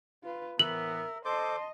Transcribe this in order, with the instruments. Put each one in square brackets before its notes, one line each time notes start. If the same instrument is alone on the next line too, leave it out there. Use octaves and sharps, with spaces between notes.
[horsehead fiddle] F4 B4
[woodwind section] A2 E3 B3 [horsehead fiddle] A#4 [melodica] E5 [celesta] F#7
[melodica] A4 C5 D6 [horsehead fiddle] D#5 [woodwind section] A5 C6